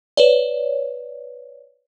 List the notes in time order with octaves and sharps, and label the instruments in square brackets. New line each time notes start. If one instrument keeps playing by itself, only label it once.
[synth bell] B4 C#5 D5